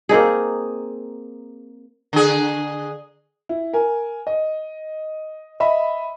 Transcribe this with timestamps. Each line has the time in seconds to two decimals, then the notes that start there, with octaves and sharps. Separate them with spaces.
0.09 A#3 C4 D#4 G#4
2.13 D3 G#4
3.49 E4
3.73 A#4 G#5
4.27 D#5
5.60 D#5 E5 B5